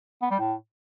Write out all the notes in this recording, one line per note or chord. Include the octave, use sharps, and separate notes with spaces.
B3
G3
A2